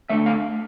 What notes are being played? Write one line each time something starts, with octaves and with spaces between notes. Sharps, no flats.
D3 A3 E5
F5